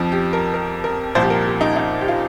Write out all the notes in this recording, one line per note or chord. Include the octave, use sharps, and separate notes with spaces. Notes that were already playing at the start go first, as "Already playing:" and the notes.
Already playing: F2 F3
G4
A#4
A#4
A#4
C2 A#2 F3 C5
G4
A#4
G4
D#4
D#4
G4
F4